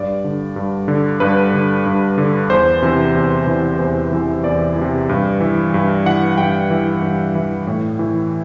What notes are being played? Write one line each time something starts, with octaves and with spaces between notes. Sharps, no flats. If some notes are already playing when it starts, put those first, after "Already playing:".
Already playing: G2 D5
D3
G2
D3
G2 B4
D3
G2
D3
E2 C5
C3 E3
E2
C3 E3
E2 C5
C3 E3
E2 D5
E3
C3
G2
E3
G2
E3 F#5
G2 G5
E3
G2
E3
A2
E3